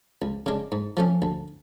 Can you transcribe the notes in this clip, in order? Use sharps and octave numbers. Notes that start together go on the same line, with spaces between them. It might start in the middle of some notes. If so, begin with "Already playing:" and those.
C#2
C#3 G#3 D4
G#2
F3 A3 C#4
D2